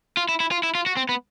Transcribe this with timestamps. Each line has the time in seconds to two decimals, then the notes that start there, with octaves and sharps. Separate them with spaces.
0.17 F4
0.29 E4
0.40 E4
0.51 F4
0.63 E4
0.75 F4
0.86 F#4
0.97 C4
1.09 B3